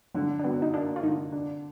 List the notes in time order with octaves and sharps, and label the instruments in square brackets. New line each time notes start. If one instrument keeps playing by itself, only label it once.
[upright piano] D3 [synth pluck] F#3
[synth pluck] D4
[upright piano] F#3 [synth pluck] B3
[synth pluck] D#4
[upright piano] A#3 [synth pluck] D4
[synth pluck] F4
[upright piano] D3 [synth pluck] D#4
[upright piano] D4